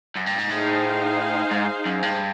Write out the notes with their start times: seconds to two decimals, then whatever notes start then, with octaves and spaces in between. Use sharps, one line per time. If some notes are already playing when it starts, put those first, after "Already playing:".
0.15 F#2
0.26 G2
0.38 G#2
0.50 A2 D#4 G#4 C5 F5
1.51 G#2
1.86 F#2
2.03 G2